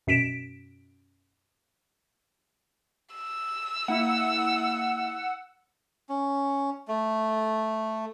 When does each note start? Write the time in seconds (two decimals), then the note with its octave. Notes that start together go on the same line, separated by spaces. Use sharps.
0.07 F#2 B2 B6 D7 E7
3.15 E6
3.88 A#3 E4 F#5
6.09 C#4
6.88 A3